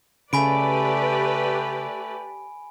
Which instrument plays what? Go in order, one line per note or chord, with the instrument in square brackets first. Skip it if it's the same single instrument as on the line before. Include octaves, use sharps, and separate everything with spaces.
[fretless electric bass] C#3 [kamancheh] A3 [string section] G4 B4 D5 [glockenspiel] G#5 B5 D7